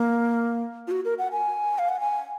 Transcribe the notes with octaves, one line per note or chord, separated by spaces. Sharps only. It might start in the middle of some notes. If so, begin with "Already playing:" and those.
Already playing: A#3
F4
F#4
A#4
F#5
G#5
F5
F#5
G#5